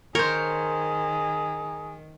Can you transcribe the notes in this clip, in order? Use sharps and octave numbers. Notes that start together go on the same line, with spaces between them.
D#3 G#4 A#4 C5 C#5